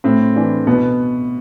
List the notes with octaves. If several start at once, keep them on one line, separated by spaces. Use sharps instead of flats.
A2 C4
E3 D4
B2 B3